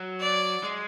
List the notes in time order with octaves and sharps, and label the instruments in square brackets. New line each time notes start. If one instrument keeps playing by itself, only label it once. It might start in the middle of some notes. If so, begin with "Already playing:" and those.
Already playing: [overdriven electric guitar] F#3
[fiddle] D5
[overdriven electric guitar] G#3